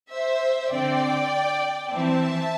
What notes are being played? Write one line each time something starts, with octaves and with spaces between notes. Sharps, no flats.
C5 E5
D3 C4 D5 G5
E3 C4 E5 A5